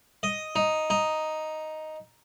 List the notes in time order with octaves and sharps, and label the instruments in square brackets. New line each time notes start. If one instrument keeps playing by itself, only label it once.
[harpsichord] D#5
D#4
D#4